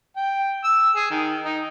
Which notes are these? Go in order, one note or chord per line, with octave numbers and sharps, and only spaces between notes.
G5
E6
G#4
D#3
D#4